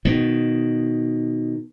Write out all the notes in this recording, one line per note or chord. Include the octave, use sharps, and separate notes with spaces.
B2 D#3